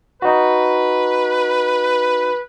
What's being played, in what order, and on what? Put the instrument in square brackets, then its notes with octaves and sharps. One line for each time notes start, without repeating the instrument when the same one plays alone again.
[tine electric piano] D#4 F#4 [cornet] B4